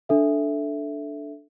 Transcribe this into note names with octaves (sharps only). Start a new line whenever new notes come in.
D4 A4 E5